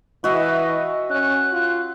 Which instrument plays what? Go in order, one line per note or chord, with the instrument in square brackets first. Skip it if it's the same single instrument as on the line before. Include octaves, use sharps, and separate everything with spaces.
[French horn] E3 [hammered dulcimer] F#4 E5 [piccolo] D#5
[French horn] C#4 [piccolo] F#6
[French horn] F4